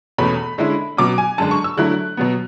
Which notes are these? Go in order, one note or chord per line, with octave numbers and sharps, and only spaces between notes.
E2 B2 A3 C#4 B5
D3 G#3 C#4 E4
B2 F#3 C#4 D6
G#5
F#2 D3 G#3 A5
C#6
E6
D3 F#3 A3 E4 F#6
B2 F#3 B3